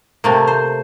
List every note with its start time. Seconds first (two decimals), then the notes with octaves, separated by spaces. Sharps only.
0.24 C3 A3 A#3
0.47 C5